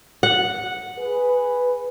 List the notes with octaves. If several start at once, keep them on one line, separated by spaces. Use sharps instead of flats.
F#5
G#4 B4